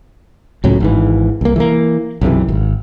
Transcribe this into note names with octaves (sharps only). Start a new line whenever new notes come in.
C#2 A2 F#3 C#4
G#1 G#2 E3
C2 A#3
E3 A3 A#3
B1 F#2 C3 E3
G#1